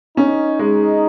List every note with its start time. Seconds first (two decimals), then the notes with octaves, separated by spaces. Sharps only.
0.17 C#4 D#4
0.59 G#3